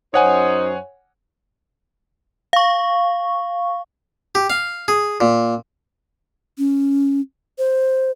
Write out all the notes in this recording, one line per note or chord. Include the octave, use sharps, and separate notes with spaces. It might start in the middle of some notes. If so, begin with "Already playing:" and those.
F#2 D#4 C5 C#5 F#5 G#5
F5 C#6
G4
F5
G#4
A#2
C#4
C5